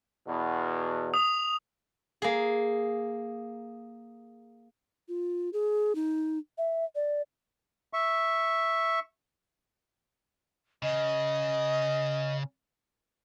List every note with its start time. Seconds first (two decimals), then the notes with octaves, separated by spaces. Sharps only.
0.26 E2 B2
1.14 D#6 F7
2.22 A#3 G#4
5.08 F4
5.53 G#4
5.95 D#4
6.58 E5
6.95 D5
7.93 E5 C#6
10.83 C#3 D#5